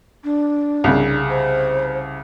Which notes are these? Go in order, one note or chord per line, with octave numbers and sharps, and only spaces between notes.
D4
C2 C#3
C5